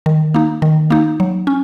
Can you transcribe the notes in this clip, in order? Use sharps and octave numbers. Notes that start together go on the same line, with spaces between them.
D#3
A#3 D#4
D#3
A#3 D#4
F#3
C#4